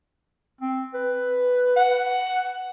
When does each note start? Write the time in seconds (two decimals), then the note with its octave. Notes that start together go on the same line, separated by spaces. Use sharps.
0.61 C4
0.94 B4
1.77 F#5